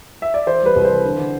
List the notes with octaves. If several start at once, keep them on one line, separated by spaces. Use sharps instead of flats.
E5
D5
E3 C5
G3 B4
C2
C5
E3
D3
D3